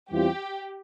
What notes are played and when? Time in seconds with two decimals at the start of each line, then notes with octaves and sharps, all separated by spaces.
0.11 E2 E3 G3 C4 F4 G4